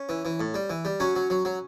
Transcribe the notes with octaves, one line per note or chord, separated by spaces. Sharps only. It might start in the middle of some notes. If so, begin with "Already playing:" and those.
Already playing: C#4
E3
E3
A2
G3
E3
G3
F#3 C#4
F#3
F#3
F#3